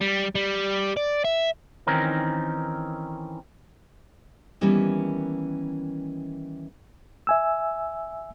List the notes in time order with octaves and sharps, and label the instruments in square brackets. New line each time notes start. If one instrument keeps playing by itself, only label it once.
[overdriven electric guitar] G3
G3
D5
E5
[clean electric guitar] D#3 E3 C4 C#4 D#4 A#4
[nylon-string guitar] D#3 E3 G3 A#3 B3 C#4
[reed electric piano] E5 G#5 E6